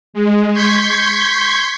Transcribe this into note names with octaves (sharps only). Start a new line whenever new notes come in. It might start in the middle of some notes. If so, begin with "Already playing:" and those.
G#3
C6 C#6 G6 G#6 B6